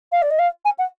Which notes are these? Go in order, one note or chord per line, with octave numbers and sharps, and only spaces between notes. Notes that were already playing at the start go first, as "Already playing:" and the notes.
F5
D5
D#5
F5
G#5
F#5